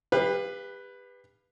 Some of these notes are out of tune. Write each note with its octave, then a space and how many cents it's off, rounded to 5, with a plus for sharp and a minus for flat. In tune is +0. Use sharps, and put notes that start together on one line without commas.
G4 +35 B4 +0 F5 +0